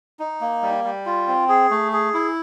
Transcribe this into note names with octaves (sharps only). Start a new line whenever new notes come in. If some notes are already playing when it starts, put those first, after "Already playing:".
D#4
A#3
G3
G3
F4
C4
G#4
A3
G#4
E4